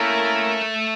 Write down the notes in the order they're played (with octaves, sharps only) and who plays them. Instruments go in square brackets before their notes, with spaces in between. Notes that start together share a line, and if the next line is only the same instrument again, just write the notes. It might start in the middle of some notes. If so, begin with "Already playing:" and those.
Already playing: [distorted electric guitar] A3 [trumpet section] A#3 C#4 E4 A#4